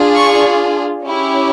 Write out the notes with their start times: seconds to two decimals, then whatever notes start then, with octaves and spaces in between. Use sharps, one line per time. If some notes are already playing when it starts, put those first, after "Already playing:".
Already playing: D4 F4 G#4
0.17 C#6
1.04 C#4 E4 G4